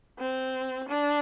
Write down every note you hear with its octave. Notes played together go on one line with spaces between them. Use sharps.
C4
D4